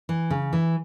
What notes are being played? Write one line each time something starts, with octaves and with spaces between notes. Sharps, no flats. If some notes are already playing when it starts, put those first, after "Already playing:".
E3
C#3
E3